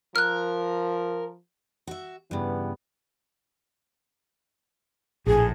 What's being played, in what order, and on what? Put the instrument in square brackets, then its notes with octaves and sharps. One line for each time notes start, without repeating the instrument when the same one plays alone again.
[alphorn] F3 [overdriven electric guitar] A#4 [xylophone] F6 F#6
[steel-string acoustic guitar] F#4 E5
[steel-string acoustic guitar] G2 C#3 [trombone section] E3 G3 B3
[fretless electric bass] A#1 A2 [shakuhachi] G#4